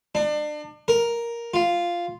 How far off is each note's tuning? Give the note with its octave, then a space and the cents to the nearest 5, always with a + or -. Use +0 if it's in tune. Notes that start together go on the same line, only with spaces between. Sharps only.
D4 +35
A#4 +5
F4 -5